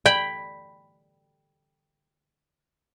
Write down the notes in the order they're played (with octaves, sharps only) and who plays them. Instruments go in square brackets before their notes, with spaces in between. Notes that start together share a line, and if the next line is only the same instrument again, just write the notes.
[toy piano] D5 [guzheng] G5 B5